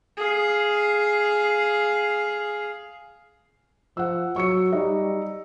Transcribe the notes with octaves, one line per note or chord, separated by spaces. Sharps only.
G#4 F5
F3 F#5 E6
F#3 C#6 E6 C#7
G3 D#4